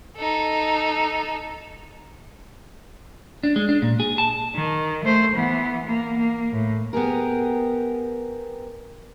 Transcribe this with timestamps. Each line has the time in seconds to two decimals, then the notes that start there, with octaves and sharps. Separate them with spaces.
0.17 D#4 A4
3.43 D4
3.56 G#3
3.69 D4
3.82 A#2
4.00 G#4
4.18 A5
4.55 D#3
5.05 A3 C5
5.35 E3 B3
5.86 A#3
6.18 A#3
6.53 A2
6.93 B3 G4 G#4 A#4